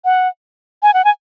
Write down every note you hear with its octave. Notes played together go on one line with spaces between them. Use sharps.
F#5
G#5
F#5
G#5